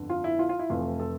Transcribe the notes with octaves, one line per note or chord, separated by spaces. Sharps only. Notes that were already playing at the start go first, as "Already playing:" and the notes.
Already playing: G1 F2 D3
F4
E4
F4
F4
E4
F1 F2 E3 A3 F4
A4